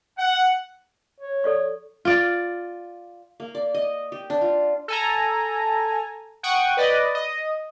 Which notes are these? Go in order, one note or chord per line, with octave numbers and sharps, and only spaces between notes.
F#5
C#5
A4 D5 C#6
F4 D5
A#3
D5
D#5
G4
D4
F4
A4 G#5 A#5
F#5 G5 C#6 D#6
B4 D5 D#5
D#5